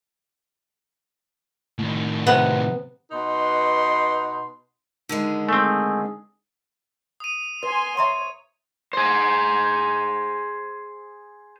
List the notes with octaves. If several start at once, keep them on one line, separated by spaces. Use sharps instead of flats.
A2 D#3
C3 B3
B2 D#4 B4 C6
D3 D#3 G#3
A3 C4 G#4
D#6 D#7
B4 G#5 C6
C#5 E5 A#5 C6
G#4 C5